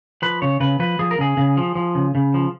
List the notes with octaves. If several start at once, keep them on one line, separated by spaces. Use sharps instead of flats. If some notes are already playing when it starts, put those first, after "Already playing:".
F3 B4
C#3 C#5
C#3 B4
F3 B4
F3 G#4
A#4
C#3 G#4
C#3
F3
F3
C#3
C#3
F3